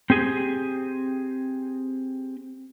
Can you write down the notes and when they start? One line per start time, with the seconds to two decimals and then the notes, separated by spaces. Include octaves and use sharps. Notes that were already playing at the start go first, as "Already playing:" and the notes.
0.10 C4 G4 G#4